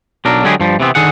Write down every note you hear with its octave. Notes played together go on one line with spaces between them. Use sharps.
B1 F#3 D4 A#4
D3 F#3 G#3 G4 G#4
G2 F3 G3
C3 E3 B3 C4
D3 D#3 G#4 F#5